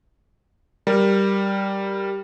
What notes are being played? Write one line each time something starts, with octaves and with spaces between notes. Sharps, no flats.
G3 A#4